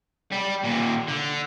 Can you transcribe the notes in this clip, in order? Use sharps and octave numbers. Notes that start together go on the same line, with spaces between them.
G3
D#2 A#2
D3